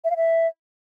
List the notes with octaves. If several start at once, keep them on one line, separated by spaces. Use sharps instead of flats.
E5
F5
E5